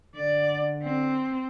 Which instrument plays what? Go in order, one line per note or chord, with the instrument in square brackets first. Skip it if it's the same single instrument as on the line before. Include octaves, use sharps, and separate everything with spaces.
[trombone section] D3 [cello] D5
[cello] C4